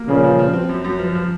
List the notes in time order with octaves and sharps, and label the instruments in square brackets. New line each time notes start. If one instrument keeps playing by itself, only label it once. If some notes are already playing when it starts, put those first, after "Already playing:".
Already playing: [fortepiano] A#3
[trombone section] A#2 C#3 [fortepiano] F3
[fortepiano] F3
F3
C4
F#2
F#2
F3
F3